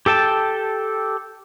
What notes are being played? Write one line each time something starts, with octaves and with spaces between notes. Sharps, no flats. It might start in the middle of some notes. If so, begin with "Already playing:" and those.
G4 A4 G5 A5